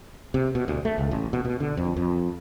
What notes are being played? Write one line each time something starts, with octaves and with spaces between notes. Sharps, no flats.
C3
B2
D2
A3
C#2
A1
B2
B2
D3
F2
F2